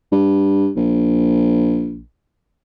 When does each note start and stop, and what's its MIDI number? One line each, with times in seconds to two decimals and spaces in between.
0.12 0.70 43
0.76 2.02 34